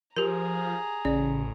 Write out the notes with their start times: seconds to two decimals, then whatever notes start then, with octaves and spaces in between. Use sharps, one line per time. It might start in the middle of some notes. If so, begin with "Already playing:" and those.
0.17 F3 G4 G#4 A#4 A#5
1.05 A1 C#3 D5